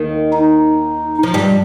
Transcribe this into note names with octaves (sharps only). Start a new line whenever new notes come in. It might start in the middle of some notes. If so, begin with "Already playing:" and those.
Already playing: D#2 D#3
D#4
F3
G2 G3